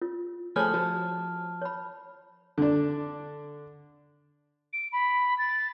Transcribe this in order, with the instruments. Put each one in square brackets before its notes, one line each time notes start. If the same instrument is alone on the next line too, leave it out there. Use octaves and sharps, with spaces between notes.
[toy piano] F4
[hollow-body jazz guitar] F3 A3 G#4 [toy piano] C5 C#5 B5 [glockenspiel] A5 F6
[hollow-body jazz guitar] F3 [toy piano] F#4
[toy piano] C#5 B5
[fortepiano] D3 D4
[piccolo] D7
B5
A6